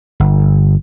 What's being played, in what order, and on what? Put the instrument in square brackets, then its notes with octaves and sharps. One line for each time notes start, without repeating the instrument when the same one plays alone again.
[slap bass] G1